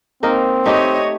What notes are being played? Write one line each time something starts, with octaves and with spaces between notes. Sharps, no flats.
A#3 C4 D#4 A#4
A3 D#4 G4 C#5 D#5